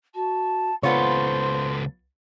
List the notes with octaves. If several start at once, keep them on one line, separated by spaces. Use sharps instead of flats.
F#4 A5
C#2 B3 F4 A4 C5 C#5 C6